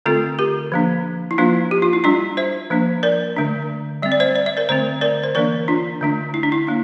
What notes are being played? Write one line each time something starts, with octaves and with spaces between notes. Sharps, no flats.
D3 A3 C4 F4 A4
G4 A#4
F3 A#3 D4
E4
F3 A#3 D4 F4
G4
F4
E4
G3 D4 F4
C5 E5
F3 A#3 D4
A#4 D5
D3 A3 D4
G3 C4 E5
D5
C5 E5
D5
E5
A#4 D5
D3 A3 C4 C5 E5
A#4 D5
C5
E3 A#3 D4 A#4 D5
D4 F4
D3 A3 D4
E4
D4
E4
A#3 D4